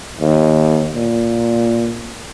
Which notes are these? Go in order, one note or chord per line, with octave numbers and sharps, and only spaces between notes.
D#2
A#2